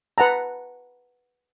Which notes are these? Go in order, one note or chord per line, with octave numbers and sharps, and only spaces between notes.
B4 F#5 A5 A#5